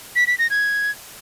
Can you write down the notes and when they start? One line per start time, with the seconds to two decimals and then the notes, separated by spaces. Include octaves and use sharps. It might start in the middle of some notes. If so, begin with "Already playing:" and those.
0.16 B6
0.27 B6
0.39 A#6
0.50 G#6